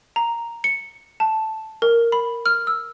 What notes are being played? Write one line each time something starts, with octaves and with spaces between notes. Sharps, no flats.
A#5
C#7
A5
A#4
B5
F6
E6